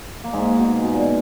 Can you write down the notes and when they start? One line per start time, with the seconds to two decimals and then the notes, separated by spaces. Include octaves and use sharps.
0.24 A#3
0.33 G#2 G#3
0.58 B2
0.83 B2
0.93 A#2